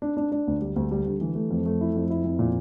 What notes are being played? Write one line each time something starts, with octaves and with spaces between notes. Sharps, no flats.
D4
D4
D4
D2
G3
D2
G3
D3
E3
A3
F2
A3
E4
F2
E4
F2
A#2